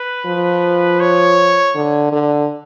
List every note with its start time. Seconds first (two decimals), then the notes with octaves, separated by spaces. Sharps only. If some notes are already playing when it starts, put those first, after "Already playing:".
Already playing: B4
0.26 F3
1.00 C#5
1.75 D3
2.12 D3